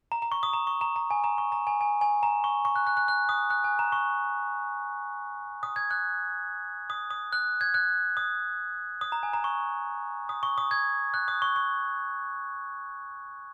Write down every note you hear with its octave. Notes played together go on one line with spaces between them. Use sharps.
A#5
A#5
C#6
D#6
A#5
C#6
A#5
A#5
G#5
A#5
C#6
A#5
G#5
G#5
G#5
A#5
C#6
C#6
F#6
F#6
F#6
F#6
D#6
F#6
G#5
A#5
C#6
D#6
G#6
F#6
D#6
D#6
F#6
G#6
F#6
D#6
D#6
A#5
G#5
A#5
C#6
D#6
C#6
D#6
G#6
F#6
D#6
C#6
C#6